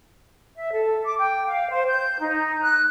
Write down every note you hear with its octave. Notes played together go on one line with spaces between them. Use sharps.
E5
A4
D6
G5
F5
C5
G6
D#4
F#6